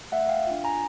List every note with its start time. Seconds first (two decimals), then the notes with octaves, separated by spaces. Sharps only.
0.12 A3 E5 F#5
0.29 F5 G5
0.47 D4 F4
0.64 G#5 A#5